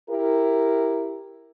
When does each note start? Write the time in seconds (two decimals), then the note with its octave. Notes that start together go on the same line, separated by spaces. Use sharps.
0.10 E4 G4 A#4